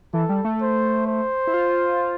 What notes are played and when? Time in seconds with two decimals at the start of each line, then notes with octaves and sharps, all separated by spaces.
0.14 E3 A4
0.29 G3
0.45 A3
0.61 C5
1.07 C5
1.47 E4
1.54 F4